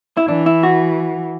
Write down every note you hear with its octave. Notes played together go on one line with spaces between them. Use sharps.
E4
E3 D4
E4
F#4